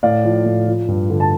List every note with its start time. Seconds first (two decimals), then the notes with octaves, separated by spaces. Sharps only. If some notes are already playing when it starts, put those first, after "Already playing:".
0.03 A2 D5 F5
0.24 F3
0.45 A2
0.67 F3
0.88 G2
1.10 D3
1.20 A5